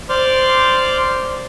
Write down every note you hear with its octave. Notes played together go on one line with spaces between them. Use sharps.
C5 D5 C6 D6 F6